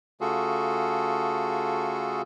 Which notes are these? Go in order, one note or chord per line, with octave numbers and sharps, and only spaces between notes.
C#3 A3 F4 F#4 G#4 A4